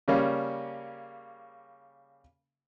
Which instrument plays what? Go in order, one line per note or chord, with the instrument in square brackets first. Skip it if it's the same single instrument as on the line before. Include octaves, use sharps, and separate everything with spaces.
[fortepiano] C#3 G3 A#3 C#4